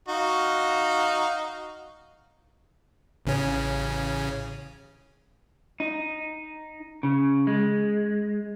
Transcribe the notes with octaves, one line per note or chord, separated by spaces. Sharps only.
D#4 F#4 F5
A1 C#3 C#4
D#4
C#3
G#3